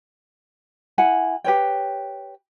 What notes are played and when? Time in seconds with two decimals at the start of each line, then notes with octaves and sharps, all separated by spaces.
0.98 E4 F#5 G#5
1.44 G4 B4 C#5 G5